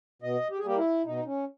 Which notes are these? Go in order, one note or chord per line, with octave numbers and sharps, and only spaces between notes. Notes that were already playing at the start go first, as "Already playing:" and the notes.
B2 D#5
G4
G#4
G3 A#3 G4
E4
B2 D#4
C#4